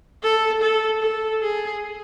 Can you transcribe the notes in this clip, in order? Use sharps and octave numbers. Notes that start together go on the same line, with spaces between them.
A4
A4
A4
G#4